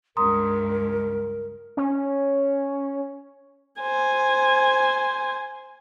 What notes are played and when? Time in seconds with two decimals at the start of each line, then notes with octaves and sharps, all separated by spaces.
0.17 C#2 G2 A#4 A#5 C6 D#6
1.77 C#4
3.81 C5 G#5